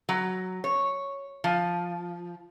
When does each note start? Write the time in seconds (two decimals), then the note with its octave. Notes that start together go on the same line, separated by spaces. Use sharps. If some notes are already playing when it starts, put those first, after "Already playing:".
0.09 F#3
0.64 C#5
1.44 F3